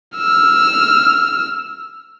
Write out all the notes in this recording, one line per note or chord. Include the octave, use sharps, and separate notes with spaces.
E6 F6